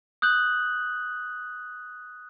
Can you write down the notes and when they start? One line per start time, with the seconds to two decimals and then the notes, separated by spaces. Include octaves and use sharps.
0.22 D#6 F#6 G6 F#7